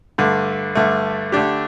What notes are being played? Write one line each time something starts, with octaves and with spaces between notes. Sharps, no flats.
G2 D3 A3
G2 D3 A3
D3 A3 D4 G4